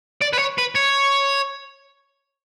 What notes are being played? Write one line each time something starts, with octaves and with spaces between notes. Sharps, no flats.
D5
B4
C#5
B4
C#5